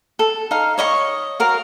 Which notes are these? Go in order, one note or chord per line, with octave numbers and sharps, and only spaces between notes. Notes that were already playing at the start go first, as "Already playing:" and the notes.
A4
D#4 F5
C#5 D#5 E5 C#6
F#4 A#4 F5